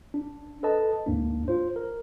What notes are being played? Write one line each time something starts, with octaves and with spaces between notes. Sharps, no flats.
D4
A4 B4 D#5 A5
D2 G#2 A#3 D4
F4 C5
A#4